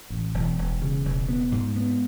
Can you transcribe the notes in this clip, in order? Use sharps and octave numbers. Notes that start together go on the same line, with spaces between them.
A1
E1
E1
C#3
E1
B3
G#2
B3